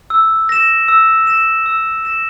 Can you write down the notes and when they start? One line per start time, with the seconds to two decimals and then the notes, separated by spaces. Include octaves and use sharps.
0.10 E6
0.49 A#6 E7
0.88 E6
1.27 A#6 E7
1.66 E6
2.05 A#6 E7